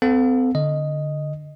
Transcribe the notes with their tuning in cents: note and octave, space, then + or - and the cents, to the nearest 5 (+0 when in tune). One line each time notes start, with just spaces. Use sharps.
C4 -40 A4 +0 F5 +35
D3 +0 D#5 +0